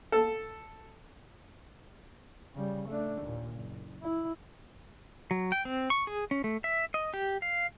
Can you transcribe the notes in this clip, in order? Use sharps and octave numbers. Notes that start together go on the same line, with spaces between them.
A4
C#3 G3
A3 D4
D#2 A#2
F#1
E4
F#3
G5
C4
C#6
G#4
C#4
A3
E5
D#5
G4
F5